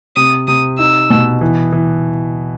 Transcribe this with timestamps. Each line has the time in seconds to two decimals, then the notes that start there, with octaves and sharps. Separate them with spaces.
0.16 C3 D#6
0.48 C3 D#6
0.79 D#4 E6
1.10 B2
1.41 E3
1.72 E3